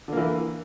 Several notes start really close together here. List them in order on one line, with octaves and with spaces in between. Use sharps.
D3 A#3 E3